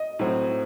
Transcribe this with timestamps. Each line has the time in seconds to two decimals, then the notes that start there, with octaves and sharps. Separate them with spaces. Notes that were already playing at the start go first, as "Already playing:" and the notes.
Already playing: D#5
0.19 A2 F#3 C4